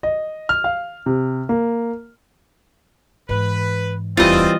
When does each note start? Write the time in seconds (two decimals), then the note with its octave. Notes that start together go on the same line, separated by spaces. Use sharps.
0.03 D#5
0.49 F6
0.64 F5
1.06 C3
1.49 A#3
3.29 G#2 E3 B4
4.17 D1 E2 E3 G3 C4 F4 D#5 A6